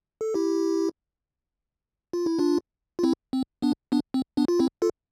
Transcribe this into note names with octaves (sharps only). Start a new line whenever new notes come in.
A4
E4 G4
F4
E4
D4 F4
F4
C4 E4
C4
B3 D4
B3 D4
C4
B3 D4
F4
C4 E4
F4 A4